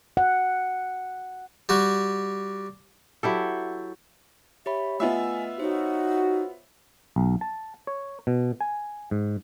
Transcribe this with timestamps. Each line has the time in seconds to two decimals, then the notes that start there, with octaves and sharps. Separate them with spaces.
0.17 F#5
1.69 G3 F#4
3.23 F#3 E4 G4 A4
4.66 G4 C#5 E5 B5
5.00 A3 B3 F4 D#5 E5 G#5
5.60 D#4 F#4 C5 C#5
7.16 B1
7.41 A5
7.87 C#5
8.27 B2
8.61 G#5
9.11 G#2